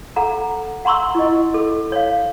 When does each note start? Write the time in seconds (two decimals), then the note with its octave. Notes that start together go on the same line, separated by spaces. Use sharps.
0.16 A4 F#5 A#5
0.85 F#5 A#5 C6 C#6 E6
1.15 E4 D#5
1.54 A4
1.92 C#5 F5